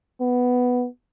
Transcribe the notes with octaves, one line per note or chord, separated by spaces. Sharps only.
B3